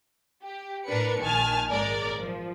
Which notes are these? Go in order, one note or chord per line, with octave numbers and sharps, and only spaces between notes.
G4
A2 D4 A#4 B4 C#7
A#1 D#3 G#5 A5 F6
G#1 G#3 A#4 D5
F3